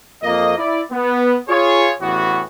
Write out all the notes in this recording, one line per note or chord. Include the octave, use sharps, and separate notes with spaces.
F2 A#3 D#5
E4 D5
B3
F4 G#4 C#5
A1 E2 A2 E3 B3 F#4